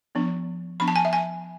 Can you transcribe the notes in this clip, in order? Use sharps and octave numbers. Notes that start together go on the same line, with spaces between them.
F3 B3 D4
F3 B3 D4 B5
A5
G#5
E5
G#5